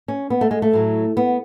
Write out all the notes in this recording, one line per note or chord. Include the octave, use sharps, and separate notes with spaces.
C#4
B3
A3
G#3
A3
A2 F#3
B3